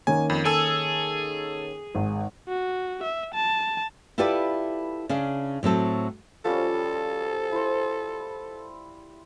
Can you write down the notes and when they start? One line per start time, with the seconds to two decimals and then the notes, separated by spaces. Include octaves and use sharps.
0.07 D#3 A#3 C#4 G#5
0.30 F2
0.45 G#4 A4 G#5 E6
1.95 G#1
2.48 F#4
3.03 E5
3.34 A5
4.18 E4 F4 G4 A4 B4 D5
5.09 C#3 C#4 D4
5.63 A2 F#3 C4 A4
6.45 F3 G3 C#4 A4
7.52 E4 C5